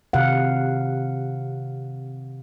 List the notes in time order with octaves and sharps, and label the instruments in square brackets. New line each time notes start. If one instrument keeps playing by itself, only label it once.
[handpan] C3 D#3 F5 F#5